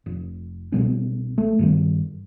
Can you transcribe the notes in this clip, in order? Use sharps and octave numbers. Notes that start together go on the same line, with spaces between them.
F1
C2 B2 G3 C#4
A3
G2 D#3 G3